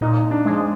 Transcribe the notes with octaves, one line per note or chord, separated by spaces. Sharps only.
A#2 D#4
D4
F3 G#3